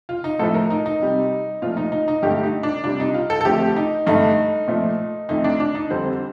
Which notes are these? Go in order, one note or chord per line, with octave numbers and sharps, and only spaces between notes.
F4
D#4
A2 F3 A3 A4
A#4
D#4
D#4
C3 G3
A#2 F3 A3 F4
D#4
D#4
D#4
G2 D3 A3 G4
D#4
D4
C3 G3 D4
D#4
F4
A4
A4
F2 D3 F3 A3 G4
D#4
G2 D3 A3 D#4
A#2 F3 A3
F2 D#3 A3 D#4
D4
D4
D#4
F2 D3 G3 C5